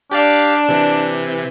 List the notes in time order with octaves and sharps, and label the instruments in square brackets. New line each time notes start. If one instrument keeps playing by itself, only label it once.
[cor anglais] D4 [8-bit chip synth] G4 D5 F5
[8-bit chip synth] C3 E3